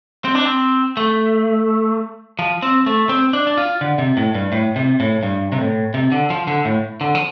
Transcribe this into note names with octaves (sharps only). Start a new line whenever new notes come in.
C4
D4
C4
A3
F3
C4
A3
C4
D4
D4
F4
D3
C3
A2
G2
A2
C3
A2
G2
C3
A2
C3
D3
F3
D3
A2
D3
F3